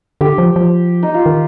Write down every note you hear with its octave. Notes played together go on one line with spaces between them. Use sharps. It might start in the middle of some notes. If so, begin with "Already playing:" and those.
D3 G4
F3
F3
D#4
F4
D#3